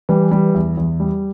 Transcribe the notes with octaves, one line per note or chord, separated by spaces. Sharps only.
E3 G3
G3
E2
E2
G3